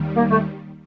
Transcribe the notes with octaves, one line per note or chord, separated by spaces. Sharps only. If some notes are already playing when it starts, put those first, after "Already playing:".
Already playing: D#2 D#3 G3
A#3
A3